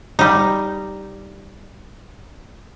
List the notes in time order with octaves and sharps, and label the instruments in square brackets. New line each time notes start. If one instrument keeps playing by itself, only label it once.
[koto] G3 D#4